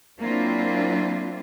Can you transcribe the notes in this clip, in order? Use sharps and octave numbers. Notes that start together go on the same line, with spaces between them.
F#3 A#3 C4 D4 E4 F4